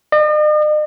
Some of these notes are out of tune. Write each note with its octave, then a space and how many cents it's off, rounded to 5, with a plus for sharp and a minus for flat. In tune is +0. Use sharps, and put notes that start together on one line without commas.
D#5 -45